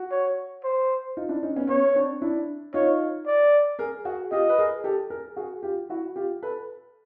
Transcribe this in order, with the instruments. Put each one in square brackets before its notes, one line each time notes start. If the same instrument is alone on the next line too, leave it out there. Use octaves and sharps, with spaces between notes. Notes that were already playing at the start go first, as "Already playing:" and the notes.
Already playing: [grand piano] F#4
[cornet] C#5
C5
[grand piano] D#4 F4
D4 E4
C#4 D#4
B3 C#4
[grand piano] B3 C#4 [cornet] C#5
[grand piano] C4 D4
D4 E4
[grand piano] D#4 F4 [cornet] C#5
[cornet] D5
[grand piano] G#4 A#4
F#4 G#4
[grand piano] F4 G4 [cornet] D#5
[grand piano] B4
G#4 A#4
G4 A4
G#4 A#4
F#4 G#4
F4 G4
E4 F#4
F4 G4
A4 B4